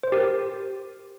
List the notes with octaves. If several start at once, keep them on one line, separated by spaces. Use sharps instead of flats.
C5
G4 A#4